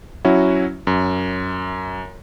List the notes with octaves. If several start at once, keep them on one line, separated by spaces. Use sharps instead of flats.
F#3 C#4 E4 F#4
F#2